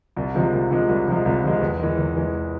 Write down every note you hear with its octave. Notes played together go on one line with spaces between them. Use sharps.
C2
C3 F3 G#3
C2
C3 F3 G#3
C2
C3 F3 G#3
C2
C3 F3 G#3
E2
E3 G#3
E2
E3 G#3